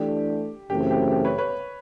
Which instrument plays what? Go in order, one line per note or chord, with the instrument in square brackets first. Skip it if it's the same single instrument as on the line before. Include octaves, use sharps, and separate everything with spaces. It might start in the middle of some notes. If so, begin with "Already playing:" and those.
Already playing: [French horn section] E3 A3 D4 [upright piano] G4
[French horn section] F#2 C#3 E3 A3 C4 [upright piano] G4
[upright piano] G4
G4
B4 C#5
B4 C#5